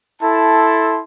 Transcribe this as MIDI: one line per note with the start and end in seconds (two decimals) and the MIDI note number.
0.22 0.99 64
0.22 0.99 69
0.22 0.99 81
0.22 0.99 84